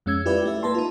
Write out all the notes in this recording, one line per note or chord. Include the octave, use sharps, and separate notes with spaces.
F2 G#3 C#4 E6 G#6
E4 F4 G4 B4 D5
A3 G4 E5
A#3 B4 A5 C6
D#4 F4